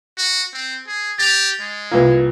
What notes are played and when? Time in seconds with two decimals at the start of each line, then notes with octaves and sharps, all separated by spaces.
0.18 F#4
0.53 C4
0.87 G#4
1.18 G4 A6 A#6 F7
1.60 G#3
1.91 C2 A#3 F4 B4